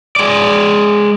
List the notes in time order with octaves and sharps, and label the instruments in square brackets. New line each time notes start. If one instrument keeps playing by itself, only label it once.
[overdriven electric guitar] G#3 D5